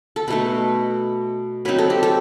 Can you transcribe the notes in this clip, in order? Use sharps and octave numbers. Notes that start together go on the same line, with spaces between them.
A4
B2 A3 D#4 B4
F#3 C4 D#4 B4
A4
G4
A4